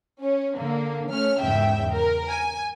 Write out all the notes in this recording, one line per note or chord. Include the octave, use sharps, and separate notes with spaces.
C#4
D3 A#3
A3 C#4 F6
E2 G#2 C#3 E5 G5
A#4
G#5